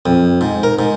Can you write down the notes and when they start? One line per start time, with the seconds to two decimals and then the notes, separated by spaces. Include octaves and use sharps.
0.06 F2
0.41 G#2
0.63 A#4
0.79 G#2